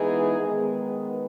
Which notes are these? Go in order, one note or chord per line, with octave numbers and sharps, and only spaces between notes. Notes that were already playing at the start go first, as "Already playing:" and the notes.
Already playing: E3 G#3 B3 D#4 G#4
D#3 G#3 B3